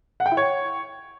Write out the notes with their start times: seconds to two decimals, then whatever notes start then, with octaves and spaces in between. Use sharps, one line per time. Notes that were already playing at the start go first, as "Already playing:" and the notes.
0.20 F#5
0.26 G5
0.31 E4
0.37 C#5